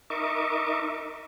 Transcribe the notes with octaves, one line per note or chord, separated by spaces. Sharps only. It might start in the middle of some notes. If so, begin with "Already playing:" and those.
D#4 A#4 D#5 E5 C#6 D6